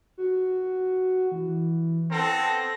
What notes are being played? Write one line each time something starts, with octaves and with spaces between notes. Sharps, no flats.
F#4
E3
B3 C4 A4 A#6